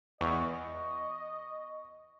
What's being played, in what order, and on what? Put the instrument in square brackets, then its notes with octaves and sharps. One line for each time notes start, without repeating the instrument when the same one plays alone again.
[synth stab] E2 [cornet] D#5 [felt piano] C#6